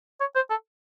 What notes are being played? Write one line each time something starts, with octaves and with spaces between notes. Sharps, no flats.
C#5
C5
A4